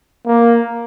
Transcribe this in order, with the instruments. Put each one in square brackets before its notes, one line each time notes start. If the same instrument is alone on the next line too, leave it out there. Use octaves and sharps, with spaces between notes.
[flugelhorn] A#3